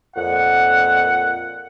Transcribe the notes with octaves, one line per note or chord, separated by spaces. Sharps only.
F2 A#2 F#5